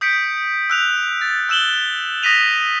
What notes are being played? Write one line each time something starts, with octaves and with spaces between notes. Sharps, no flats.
D#6 G6 B6 C#7 D7
E6 F#6 F7
A6
E6 F#6 E7 F#7 G7
D#6 A#6 B6 D#7 F7